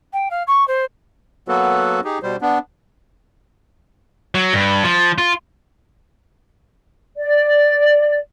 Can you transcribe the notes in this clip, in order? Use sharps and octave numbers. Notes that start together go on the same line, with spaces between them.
G5
F5
C#6
C5
F#3 A#3 B3 F#4 A4 B4
D#4 G4 G#4
B2 G3 C5
B3 D4
F#3
G2
F3
F4
D5